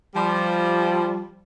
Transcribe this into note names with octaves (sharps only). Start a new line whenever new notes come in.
F3 G3